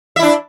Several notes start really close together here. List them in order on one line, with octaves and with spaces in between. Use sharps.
E5 E4 D4